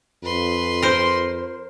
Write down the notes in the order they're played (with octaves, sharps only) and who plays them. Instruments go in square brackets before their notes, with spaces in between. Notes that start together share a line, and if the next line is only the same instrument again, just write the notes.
[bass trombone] F2 [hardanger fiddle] B4 C6
[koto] A#4 C5